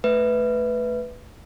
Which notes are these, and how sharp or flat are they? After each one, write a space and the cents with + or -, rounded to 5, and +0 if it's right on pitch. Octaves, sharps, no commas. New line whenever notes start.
A3 +0 B4 +0 E5 +0